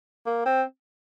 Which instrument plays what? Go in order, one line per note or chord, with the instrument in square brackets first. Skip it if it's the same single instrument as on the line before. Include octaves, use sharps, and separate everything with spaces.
[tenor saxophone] A#3
C4